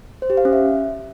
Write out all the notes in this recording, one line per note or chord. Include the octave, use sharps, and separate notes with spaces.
C5
G4
F5
C#4
E5